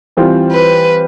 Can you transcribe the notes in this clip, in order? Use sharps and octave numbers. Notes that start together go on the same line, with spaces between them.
E3 G3 C4 F4
B4